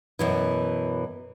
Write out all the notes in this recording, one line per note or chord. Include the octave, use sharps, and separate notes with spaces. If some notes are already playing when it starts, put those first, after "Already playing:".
F#2 B2 E3